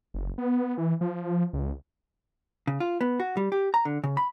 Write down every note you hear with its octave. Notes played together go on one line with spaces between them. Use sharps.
F#1
B3
E3
F3
C#2
C#3
F4
B3
F#4
G3
G4
A#5
D3
C#3
B5